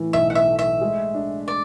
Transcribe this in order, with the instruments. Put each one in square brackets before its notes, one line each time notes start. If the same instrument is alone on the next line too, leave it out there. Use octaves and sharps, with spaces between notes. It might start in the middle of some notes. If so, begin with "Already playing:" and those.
Already playing: [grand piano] A2 E3
[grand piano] B1 [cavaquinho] E5
[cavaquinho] F#5
E5
[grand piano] A3
[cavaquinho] E5
[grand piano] G#3
D4
[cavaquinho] D5